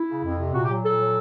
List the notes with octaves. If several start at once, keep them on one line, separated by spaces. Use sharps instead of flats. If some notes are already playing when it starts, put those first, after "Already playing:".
Already playing: E4
C#3
F2
C3
A#2 F#4
G4
F#3
A#2 A4
F#3